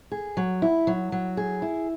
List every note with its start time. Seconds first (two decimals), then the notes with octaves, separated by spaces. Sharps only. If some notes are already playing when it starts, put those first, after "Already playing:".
0.12 G#4
0.37 F#3
0.62 E4
0.87 F#3
1.12 F#3
1.37 G#4
1.62 E4